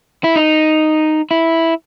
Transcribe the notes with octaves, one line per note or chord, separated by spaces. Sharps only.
E4
D#4
E4